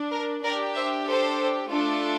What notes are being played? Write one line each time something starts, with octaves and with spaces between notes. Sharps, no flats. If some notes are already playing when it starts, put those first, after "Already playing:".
Already playing: D4
A#4
D4 G4 A#4 D5
C5 E5
A4 C5
A3 D4 F4 A4